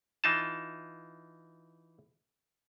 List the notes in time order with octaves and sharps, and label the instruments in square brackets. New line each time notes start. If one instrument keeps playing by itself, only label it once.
[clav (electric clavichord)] E3 D#4 F4 A5